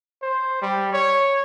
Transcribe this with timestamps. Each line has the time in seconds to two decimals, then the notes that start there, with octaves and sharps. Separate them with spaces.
0.22 C5
0.62 G3
0.93 C#5